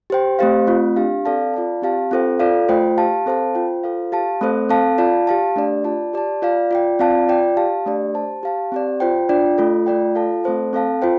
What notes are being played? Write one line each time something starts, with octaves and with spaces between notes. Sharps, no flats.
G4 C5 G5
A3 C4 G4 C5 F5
A3 C4 F4
D4 G4 F5
C4 A4 D5 F5 A5
F4 D5 F5 A5
C4 G4 F5 A5
C4 F4 A4 C5 G5
F4 A4 D5 F5
A3 F4 C5 G5
G4 F5 A5
C4 A4 C5 F5 A5
F4 C5 G5
F4 A4 C5 F5
G4 F5 A5
A3 C4 A4 C5
C4 A4 F5 A5
F4 D5 F5 A5
G4 F5 A5
A3 D4 G4 D5
F4 D5 A5
G4 D5 A5
F4 D5 F5
F4 D5 G5
C4 F4 D5 F5 A5
F4 D5 G5
G4 F5 A5
A3 D4 G4 D5
G4 C5 A5
G4 F5 A5
C4 G4 D5
F4 C5 G5
D4 F4 D5 G5
A3 F4 A4
A3 F4 D5 G5
F4 A4 F5 A5
A3 C4 A4 C5 A5
C4 A4 F5 A5
F4 C5 G5